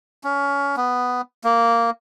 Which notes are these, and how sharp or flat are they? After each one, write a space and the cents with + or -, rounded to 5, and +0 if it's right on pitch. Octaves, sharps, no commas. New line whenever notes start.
C#4 +20
B3 +5
A#3 -10